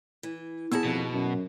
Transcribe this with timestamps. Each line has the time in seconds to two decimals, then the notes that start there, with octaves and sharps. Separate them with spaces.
0.23 E3
0.72 D#2 B3 E4 G#4 A5
0.85 F2 B2
1.13 F#2